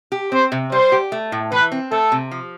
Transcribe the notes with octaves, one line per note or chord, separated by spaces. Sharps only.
G4
C4 C5
C3
G3 C5
G4
A3
A2
E3 B4
C4
A3 A4
C3
F3